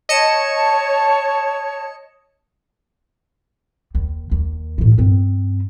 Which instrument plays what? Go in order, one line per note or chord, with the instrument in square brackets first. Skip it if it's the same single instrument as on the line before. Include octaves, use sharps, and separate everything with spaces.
[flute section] C#5 A5 [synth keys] D#5 C#7 E7
[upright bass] D#2
D#2
A2 E3
G2 C4